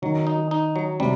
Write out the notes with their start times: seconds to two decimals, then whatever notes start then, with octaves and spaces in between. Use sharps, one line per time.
0.02 D#3 F#3
0.27 D#4
0.51 D#4
0.76 F#3
1.00 C3 G3